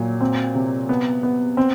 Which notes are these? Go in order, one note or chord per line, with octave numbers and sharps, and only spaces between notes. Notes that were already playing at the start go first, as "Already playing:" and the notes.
Already playing: A#2 F#3
C4
C3
B3
B3
C4